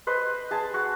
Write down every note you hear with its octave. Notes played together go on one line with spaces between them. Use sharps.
B4 C5 D#5
G#4 A5
F#4